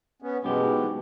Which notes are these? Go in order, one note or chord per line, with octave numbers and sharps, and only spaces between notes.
B3 C#4
F#2 B2 E3 G#3 B3 G4
G#2